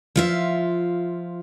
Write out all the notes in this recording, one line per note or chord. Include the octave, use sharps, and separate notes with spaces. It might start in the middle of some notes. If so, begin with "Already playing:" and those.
F3 F4 E5